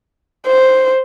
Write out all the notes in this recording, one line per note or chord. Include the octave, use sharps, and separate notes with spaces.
C5